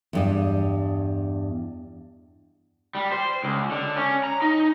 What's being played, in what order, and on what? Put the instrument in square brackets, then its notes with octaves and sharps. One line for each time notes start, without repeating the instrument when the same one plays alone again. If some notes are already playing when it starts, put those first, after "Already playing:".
[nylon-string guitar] E2 G2 D#5
[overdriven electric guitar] G3
C5
C#2
D3
C#4
A#5
D#4